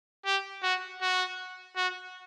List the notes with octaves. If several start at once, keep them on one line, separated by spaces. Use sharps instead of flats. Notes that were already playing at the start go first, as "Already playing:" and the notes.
G4
F#4
F#4
F#4